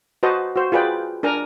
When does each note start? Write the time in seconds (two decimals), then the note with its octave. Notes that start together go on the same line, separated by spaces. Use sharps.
0.23 F#4 B4 C5 D#5 A5
0.56 F#4 C5
0.72 F4 G#4 B4 D5 G5
1.23 D4 A#4 G#5 A#5